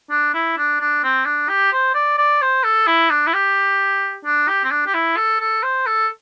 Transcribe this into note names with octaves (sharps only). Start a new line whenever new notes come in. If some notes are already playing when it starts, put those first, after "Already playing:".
D4
E4
D4
D4
C4
D4
G4
C5
D5
D5
C5
A4
E4
D4
E4
G4
D4
G4
C4
D4
G4
E4
A4
A4
C5
A4